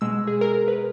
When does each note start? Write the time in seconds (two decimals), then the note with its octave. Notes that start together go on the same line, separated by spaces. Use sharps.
0.01 B2 G#3 E6
0.27 G#4
0.41 A#4
0.54 A#4
0.68 B4